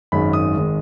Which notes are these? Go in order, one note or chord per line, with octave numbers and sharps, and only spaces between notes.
G#1 F#2 D#3 G#3 B5
D#6
G#1 D#3 G#3